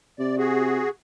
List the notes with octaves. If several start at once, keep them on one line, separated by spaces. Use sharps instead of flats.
C3 D5
F#4 G#4